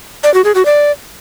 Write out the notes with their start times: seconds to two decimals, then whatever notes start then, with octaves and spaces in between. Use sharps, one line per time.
0.23 D5
0.34 F#4
0.44 G#4
0.55 F#4
0.65 D5